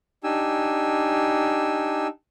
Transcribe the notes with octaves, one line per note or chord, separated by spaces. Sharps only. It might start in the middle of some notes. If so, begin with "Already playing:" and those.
D4 D#4 G4 G#5 E6